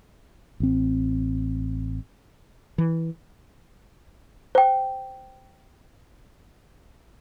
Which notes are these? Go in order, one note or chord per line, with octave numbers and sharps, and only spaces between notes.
A1 C4
E3
C5 G5